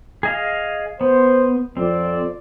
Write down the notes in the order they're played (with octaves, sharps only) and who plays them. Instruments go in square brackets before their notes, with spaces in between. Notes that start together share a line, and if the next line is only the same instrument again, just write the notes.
[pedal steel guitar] G#4 D#5 F5
[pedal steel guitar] B3 [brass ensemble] C5
[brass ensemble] F2 D5 [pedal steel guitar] C4